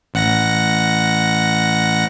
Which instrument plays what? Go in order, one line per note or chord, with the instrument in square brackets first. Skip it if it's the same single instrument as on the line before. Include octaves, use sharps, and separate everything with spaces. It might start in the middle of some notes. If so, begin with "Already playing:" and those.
[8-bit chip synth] A1 F#5 A#6